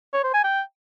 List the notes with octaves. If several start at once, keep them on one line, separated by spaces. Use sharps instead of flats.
C#5
C5
G#5
G5